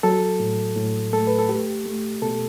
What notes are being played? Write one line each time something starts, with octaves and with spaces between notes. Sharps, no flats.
F#3 A4
A2
A2
A3 A4
B4
A4
A3 G4
A3
B2 A4